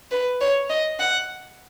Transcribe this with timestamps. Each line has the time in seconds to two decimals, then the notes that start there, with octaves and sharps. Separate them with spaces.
0.12 B4
0.41 C#5
0.70 D#5
1.00 F#5